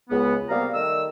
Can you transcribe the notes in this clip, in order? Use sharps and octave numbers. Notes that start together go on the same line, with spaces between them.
C#2 B3
C3 G3 A#3 B3 F5 A#5
D#3 G3 A3 E6